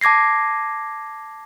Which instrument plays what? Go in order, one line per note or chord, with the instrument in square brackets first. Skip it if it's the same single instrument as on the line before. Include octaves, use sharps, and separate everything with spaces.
[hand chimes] A5 D6 G#6 A#6 C7